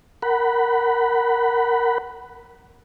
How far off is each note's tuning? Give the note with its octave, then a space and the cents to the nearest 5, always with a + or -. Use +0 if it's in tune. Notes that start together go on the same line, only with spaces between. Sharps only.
A#4 +0 F#5 +20 B5 +0